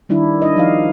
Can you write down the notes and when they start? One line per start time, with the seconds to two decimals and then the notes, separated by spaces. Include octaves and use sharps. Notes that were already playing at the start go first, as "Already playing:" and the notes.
0.09 D#3 G3 D4 E4
0.42 D4 D#5
0.57 F3 D#4 F5